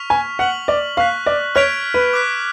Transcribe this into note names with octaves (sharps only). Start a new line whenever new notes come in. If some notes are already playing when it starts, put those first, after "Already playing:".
Already playing: C#6 F6 B6 F7
G#5
F#5 F6 B6 F#7
D5
F5 C#6 F#6 B6
D5
C#5 F6 G#6 B6 D7 F7
B4
D6 F#6 B6